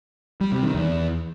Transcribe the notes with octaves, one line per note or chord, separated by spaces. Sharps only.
G3
C3
D#3
E2